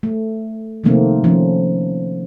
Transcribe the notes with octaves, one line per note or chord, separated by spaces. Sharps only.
A3
C3 D#3 F3 A3 A#3 C4
F3 C#4